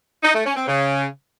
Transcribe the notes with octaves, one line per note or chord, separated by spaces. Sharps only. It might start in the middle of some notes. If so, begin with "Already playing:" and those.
D#4
A3
C#4
C4
C#3